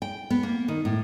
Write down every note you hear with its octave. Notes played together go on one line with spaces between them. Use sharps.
G5
B3
A#3
D#3
A2